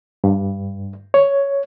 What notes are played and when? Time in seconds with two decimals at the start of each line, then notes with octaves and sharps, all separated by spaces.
0.24 G2
1.14 C#5